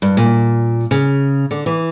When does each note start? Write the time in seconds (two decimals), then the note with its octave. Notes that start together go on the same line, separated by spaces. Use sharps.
0.02 G2
0.17 A#2
0.91 C#3
1.51 D3
1.66 E3